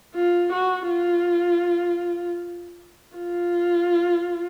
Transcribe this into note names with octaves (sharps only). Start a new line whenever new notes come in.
F4
F#4
F4
F4